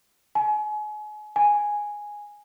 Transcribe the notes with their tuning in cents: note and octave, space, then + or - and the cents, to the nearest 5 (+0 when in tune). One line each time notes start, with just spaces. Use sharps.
G#5 +35
G#5 +0